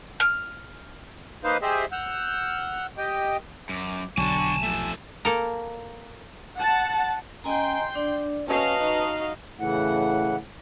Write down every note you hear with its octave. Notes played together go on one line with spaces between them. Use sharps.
F6
A#3 D#4 B4 C5 F5
G4 G#4 C5 D#5 E5
F#5 E6 F6 G6
G4 D#5 G5
F#2 D6
B1 D3 F#3 G#5 A5 C#6
F3 A3 E5
A#3 A4 A#4
F#5 A5
C#4 D#5 G5 G#5 A#5 C6
D4 D5
C#4 F#4 B4 D#5 F5 A5
D#4
A2 C#3 E3 F#5